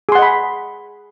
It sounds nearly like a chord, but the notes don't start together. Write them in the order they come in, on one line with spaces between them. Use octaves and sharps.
G#4 C6 F#5 D#5 B5